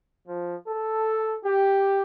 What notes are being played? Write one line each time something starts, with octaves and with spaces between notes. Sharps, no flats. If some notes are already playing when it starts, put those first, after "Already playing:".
F3
A4
G4